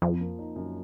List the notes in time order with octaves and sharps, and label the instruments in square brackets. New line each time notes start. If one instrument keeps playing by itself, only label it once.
[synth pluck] F2 [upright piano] F3
[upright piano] A#3
D#4
F#2